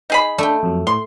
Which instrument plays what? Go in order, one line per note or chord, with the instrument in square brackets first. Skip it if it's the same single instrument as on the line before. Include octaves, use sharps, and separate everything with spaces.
[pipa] D#4 G#4 B5
[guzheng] A3 E5 G5 [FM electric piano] D4
[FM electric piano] F2 F#3
[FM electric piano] A2 [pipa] C6